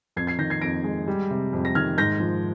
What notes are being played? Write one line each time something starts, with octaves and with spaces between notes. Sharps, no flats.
F2 G#6 C7
G#6 C7
D#3 G6 A#6
G#6 C7
F2 A#6 D7
G#3
G3
C3
F2
A#6
D#3 F6 G#6
G#2 G6 A#6
F3